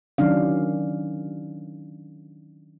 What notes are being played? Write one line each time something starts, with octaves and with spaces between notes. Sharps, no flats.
D#3 F#3 C#4 D4 F5